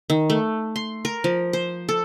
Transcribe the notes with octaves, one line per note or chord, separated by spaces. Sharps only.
D#3
A3
C6
A#4
F3
C5
A4